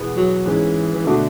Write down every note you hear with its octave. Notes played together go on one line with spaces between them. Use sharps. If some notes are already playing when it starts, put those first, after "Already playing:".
Already playing: E2 B2 G#3 B3
F#3
G#2 E3 G#3 C#4 G#4
E3
B2 D3 A3 D4 F#4